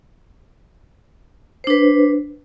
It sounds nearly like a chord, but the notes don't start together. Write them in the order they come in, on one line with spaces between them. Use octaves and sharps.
C5 D4 B4